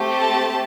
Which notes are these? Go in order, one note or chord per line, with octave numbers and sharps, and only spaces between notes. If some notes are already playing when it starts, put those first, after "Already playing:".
Already playing: A3 C4 G4
A5